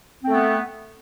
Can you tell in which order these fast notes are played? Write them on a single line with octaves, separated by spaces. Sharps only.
C4 A3 B3